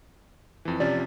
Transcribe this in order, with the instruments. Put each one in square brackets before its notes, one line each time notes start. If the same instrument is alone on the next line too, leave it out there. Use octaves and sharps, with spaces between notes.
[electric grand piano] F2 E3
[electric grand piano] C3 F3 C#4 [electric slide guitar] D5